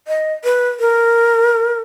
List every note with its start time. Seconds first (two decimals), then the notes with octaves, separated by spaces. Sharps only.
0.08 D#5
0.44 B4
0.80 A#4